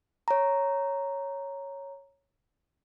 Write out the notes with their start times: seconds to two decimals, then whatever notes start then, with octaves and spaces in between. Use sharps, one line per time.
0.28 C#5 A#5